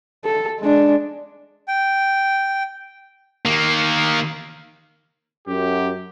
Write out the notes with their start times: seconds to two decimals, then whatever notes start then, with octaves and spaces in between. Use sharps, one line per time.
0.25 A4
0.60 G#3 D4
1.68 G5
3.45 D#3 A#3
5.48 F#2 G4